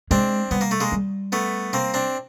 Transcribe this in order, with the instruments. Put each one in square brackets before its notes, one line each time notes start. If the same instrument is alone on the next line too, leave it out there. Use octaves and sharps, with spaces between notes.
[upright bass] G#3 [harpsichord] C4 D4
[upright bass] G3 [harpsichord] B3
[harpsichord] A#3
A3
G#3 A#3
[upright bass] G3
[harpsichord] A3 B3
A#3 C4
C4 D4